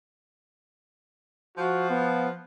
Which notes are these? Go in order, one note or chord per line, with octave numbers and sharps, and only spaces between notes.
F3 F#4
B3